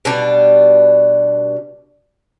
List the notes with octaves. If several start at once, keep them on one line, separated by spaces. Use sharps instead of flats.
B2 G3 D4